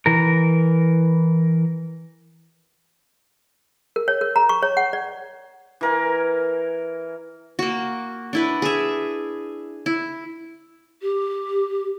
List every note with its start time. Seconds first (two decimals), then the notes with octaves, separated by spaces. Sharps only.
0.06 E3 A#4
3.96 A#4
4.08 C#5
4.21 A#4
4.36 A#5
4.49 C#6
4.63 C#5
4.77 F#5
4.93 D5
5.81 E3 A#4 G#5
7.59 A#3 F#4
8.33 D4 E4 B4
8.62 G#4 E5
9.86 E4
11.02 G4